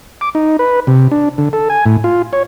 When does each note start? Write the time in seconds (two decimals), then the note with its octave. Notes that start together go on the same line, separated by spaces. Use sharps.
0.21 D6
0.35 D#4
0.59 B4
0.87 C3
1.11 D4
1.38 D3
1.53 A4
1.70 G#5
1.86 A2
2.04 F4
2.33 C#5